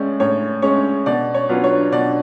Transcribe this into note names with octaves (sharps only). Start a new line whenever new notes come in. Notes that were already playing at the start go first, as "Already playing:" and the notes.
Already playing: A2 G#3 C#4 D5
A2 C#5
G#3 C#4 C#5
B2 D5
C#5
F#3 B3 D4 F4
C#5
B2 D5